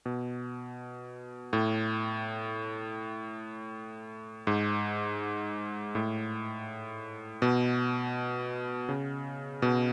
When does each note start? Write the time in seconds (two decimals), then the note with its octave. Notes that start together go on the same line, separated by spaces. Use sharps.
0.06 B2
1.53 A2
4.47 G#2
5.95 A2
7.42 B2
8.89 C#3
9.62 B2